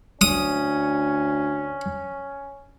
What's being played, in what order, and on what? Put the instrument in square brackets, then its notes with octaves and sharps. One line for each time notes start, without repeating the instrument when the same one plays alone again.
[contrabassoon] D2 [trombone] C#4 [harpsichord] D#6